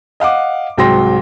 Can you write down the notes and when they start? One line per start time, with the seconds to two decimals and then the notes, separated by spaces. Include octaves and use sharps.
0.20 D#5 F5 F#5 D6
0.78 C2 G#2 F#3 G5 C6 A#6